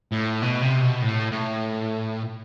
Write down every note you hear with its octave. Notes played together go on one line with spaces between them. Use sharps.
A2
B2
C3
B2
A2
A2